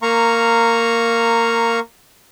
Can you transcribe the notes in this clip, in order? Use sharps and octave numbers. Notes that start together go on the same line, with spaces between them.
A#3 F5 A#5 C#6